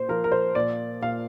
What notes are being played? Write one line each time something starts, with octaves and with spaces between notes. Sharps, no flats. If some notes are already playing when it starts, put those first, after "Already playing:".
Already playing: A#2 C5
F3 A#4
A#4
C5
A#2 D5
A#2 F5